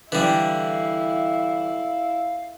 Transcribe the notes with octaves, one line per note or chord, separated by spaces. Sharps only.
D3 E3 G3 E4 F5